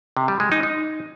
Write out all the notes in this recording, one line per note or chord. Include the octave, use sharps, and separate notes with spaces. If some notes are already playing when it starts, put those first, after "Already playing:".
C3
G3
G#3
D#4
D#4